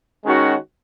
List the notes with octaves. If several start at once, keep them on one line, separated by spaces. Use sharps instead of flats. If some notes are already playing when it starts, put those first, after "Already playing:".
D#3 G#3 C#4 F#4